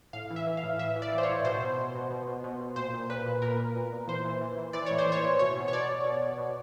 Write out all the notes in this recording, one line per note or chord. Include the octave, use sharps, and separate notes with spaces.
A2 F5
E3
E5
E3
F5
A2
E3 E5
E3
D5
E3
C5
C#5
A2
B2 C5
B2
B2
B2
B2
B2
B2
B2
A#2 C5
A#2
A#2 B4
A#2
A#2 A#4
A#2
A#2
A#2
E3 C5
E3
E3
E3
E3 D5
A2 C#5
C5
E3
C#5
E3
B2 C#5
B2
C#5
B2 D5
B2
B2
B2
B2